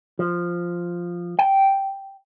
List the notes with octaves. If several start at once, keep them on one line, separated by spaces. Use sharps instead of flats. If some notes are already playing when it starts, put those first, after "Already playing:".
F3
G5